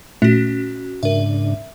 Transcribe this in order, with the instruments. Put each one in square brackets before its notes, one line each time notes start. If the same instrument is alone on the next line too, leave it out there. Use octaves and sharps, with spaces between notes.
[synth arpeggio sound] A#2 A3 [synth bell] C#4 F#4
[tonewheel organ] G#2 C#3 D4 [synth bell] A#4 E5